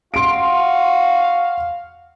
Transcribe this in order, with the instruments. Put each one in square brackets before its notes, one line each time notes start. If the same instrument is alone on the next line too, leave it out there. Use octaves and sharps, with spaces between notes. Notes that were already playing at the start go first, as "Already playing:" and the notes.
[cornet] F#4 [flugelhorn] F5 [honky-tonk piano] C6 D7